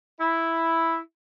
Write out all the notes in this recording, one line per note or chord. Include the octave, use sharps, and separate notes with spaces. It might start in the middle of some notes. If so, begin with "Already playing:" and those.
E4